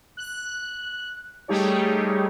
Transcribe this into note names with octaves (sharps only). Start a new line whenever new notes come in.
F#6
G3 A3 D#4 G4 G#4 C#5